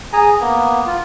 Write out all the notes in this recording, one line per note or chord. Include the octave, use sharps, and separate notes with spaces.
G#4 G#5 A#5
A#3 B3
F4